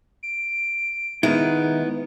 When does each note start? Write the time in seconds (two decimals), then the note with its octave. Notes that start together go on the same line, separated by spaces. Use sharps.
0.23 D7
1.23 D#3 G#3 B3 D#4 E4